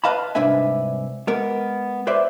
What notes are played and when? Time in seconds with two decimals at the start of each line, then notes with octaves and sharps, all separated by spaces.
0.04 B4 D#5 F5 A5 B5
0.35 C2 G#2 D4 B4 E5 G#5
1.27 G#3 B3 A#4
2.07 B4 C5 D5 E5